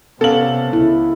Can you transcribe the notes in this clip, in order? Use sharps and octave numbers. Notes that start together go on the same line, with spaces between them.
C3 B3 C#4 A4 F5 F#7
C#2 E4